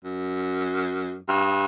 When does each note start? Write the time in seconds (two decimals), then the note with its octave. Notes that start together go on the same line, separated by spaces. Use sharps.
0.04 F#2
1.28 G2